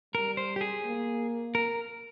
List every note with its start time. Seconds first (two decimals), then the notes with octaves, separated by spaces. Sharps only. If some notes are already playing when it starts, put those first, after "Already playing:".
0.15 G3 A#4
0.37 C5
0.56 G4
0.61 G#4
0.85 A#3
1.55 A#4